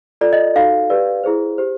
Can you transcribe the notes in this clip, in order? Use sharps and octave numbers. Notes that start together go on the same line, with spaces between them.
F4 A4 D5
D#5
D#4 F#4 A4 F5
G4 B4 D5
E4 G#4 C5
G4 C5